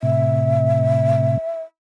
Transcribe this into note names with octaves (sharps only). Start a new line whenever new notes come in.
A2 C3 E5